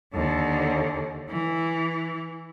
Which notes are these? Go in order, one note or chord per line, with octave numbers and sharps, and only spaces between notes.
D#2 D3
E3